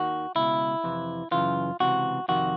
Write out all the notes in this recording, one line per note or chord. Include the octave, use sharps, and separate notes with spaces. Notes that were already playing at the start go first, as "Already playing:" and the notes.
Already playing: D#2 D#3 F#4
C#2 B2 E4
F2 C3 E3
F#2 C#3 E3 F4
C#2 C3 E3 F#4
F2 C3 D#3 F#4